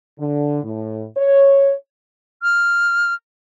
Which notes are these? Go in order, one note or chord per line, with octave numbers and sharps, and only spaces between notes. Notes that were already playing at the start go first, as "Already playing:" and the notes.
D3
A2
C#5
F6